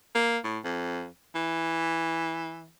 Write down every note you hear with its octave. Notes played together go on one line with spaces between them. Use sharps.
A#3
A2
F2
E3